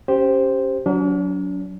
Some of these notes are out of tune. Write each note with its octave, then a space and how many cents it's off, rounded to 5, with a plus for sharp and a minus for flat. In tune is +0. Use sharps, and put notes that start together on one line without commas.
C#4 +0 G4 +0 C5 +0
F#3 +0 D4 -45